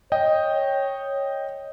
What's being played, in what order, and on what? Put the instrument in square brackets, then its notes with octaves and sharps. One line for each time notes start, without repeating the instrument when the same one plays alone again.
[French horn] C#5 [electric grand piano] D#5 G5